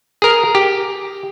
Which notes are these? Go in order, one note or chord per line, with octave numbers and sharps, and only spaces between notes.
G#4 A#4
G4